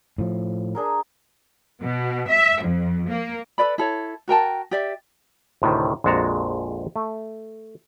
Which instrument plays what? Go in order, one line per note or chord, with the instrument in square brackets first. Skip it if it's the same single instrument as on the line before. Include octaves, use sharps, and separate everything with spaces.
[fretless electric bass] A2 F3
[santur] D4 G#4 A#4
[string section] B2
E5
F2
A#3
[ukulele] A4 B4 D5 B5
E4 A4 C#5
F#4 A#4 G5 A5
G4 D5 E5
[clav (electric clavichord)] D2 A2 C3 D#3
A#1 F2 G#3 F#4 A5 A#5
A3